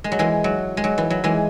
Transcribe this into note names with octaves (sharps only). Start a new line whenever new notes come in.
G#3
F#3
E3 G#3
F#3
G#3
F#3
E3
F#3
E3 G#3